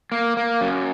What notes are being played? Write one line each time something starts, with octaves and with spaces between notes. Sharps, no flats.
A#3
A#3
F#2